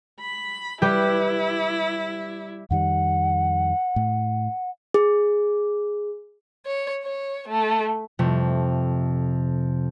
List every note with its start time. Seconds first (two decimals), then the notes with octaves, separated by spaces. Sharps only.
0.20 B5
0.82 G3 E4 G4 B4
2.71 F2 D#3 G3 F#5
3.96 A2
4.94 G#4
6.67 C#5
7.04 C#5
7.49 A3
8.19 F2 C3 A3